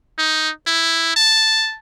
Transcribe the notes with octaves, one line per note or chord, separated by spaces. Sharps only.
D#4
E4
A5